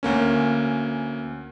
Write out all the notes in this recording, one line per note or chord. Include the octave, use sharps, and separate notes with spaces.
D2 A#3 C#4